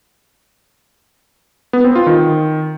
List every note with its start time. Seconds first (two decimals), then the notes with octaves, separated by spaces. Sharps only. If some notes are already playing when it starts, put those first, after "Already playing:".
1.73 B3
1.84 C4
1.96 F4
2.07 D#3